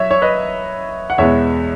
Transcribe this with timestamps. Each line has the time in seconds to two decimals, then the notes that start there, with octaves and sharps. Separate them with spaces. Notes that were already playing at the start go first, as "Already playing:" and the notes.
Already playing: F#3 C#5 E5
0.11 C#5
0.22 B4 D#5
1.10 F#5
1.18 E2 B2 G#3 B3 C#5 E5